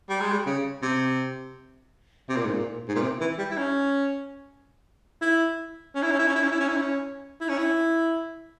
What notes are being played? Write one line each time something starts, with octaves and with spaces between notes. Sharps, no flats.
G3
G#3
G3
C#3
C3
C3
A#2
G#2
A#2
G#2
A#2
C3
E3
G3
E4
C#4
E4
C#4
E4
C#4
E4
C#4
E4
C#4
E4
C#4
E4
C#4
E4
C#4
E4